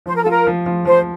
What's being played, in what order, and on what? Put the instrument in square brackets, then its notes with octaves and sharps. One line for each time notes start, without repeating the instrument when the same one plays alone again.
[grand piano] F3 [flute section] C5
[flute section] A#4
A4
[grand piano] F4 [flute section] A#4
[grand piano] F3
F3
[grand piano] F3 [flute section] C5